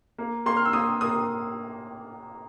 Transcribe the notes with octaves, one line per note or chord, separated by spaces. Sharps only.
A#3
A#3 C6
F6
E6
A#3 D#6
A#3 D#6